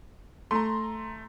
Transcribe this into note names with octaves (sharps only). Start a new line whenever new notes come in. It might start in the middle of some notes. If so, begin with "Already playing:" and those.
A3 A#5 C6